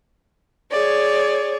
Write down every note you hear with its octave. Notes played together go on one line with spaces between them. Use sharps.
G#4 C#5 D5